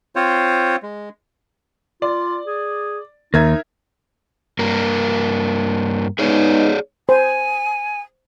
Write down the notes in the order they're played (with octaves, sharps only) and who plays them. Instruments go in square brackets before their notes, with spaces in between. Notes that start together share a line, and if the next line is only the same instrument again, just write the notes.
[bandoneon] C4 F4 C5 C#5
G#3
[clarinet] F4 [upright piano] D5
[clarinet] G#4
[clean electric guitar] D#2 [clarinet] D#4 [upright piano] A#4 E5 G#6
[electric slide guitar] G2 A#3 A#4
[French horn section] G#3 B3 D#4 [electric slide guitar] G#4 C#5 D5
[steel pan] C5 [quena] G#5